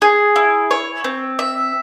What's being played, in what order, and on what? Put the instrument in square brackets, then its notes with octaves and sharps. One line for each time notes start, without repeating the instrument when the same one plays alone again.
[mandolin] G#4
E4
C#5
C4
E5